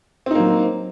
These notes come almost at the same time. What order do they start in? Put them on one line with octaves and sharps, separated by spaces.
C4 D#4 A#3 F#3